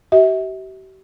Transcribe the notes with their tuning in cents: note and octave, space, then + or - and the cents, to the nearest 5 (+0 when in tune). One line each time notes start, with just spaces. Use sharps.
G4 -45 E5 -35